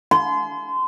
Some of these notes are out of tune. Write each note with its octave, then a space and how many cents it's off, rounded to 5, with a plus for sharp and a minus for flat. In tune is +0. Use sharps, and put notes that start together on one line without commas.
G#5 +45 C6 -25